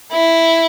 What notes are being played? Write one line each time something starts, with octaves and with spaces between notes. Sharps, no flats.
E4